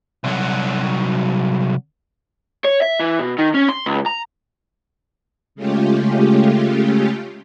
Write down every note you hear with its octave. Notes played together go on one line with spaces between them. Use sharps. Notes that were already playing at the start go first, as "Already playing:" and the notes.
C2 F#3
C#5
E5
E3
B2
D#3
C#4
C6
C#2
A#5
C#3 G#3 A3 C#4 F4 G4